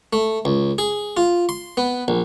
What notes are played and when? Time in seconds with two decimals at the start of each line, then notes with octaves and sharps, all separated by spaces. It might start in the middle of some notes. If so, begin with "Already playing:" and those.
0.13 A3
0.45 C#2
0.78 G#4
1.17 F4
1.49 C6
1.77 B3
2.08 A#1